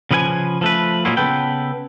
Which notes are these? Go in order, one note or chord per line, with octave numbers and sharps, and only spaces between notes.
C#3 F3 B4 E5 G#5
F3 A3 B4
A#2 F#3 G#3 A#3 E4 F4
C#3 B3 A4 B4 G5